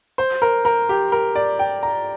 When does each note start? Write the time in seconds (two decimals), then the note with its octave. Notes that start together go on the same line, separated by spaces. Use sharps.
0.18 C5
0.42 A#4
0.65 A#4
0.89 G4
1.12 A#4
1.35 D5
1.59 G5
1.83 A#5